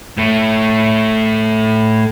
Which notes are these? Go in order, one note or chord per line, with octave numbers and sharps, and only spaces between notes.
A2 A3